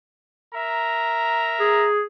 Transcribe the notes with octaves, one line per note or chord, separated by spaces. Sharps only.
A#4 E5 A#5
G#4